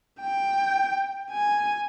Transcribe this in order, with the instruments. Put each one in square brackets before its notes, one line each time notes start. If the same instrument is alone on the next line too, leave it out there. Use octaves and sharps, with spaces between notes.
[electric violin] G5
G#5